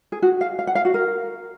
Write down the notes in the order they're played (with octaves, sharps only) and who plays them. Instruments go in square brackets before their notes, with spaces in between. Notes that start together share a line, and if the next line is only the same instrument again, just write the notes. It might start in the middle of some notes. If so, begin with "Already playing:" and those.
[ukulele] G#4
F#4
F5
F5
F#5
F5
F#4
A#4